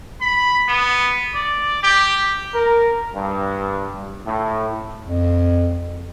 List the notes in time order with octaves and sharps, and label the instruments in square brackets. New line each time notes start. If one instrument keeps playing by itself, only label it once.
[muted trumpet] B5
B3
D5
G4
[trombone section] A#4
G2
A2
[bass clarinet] F2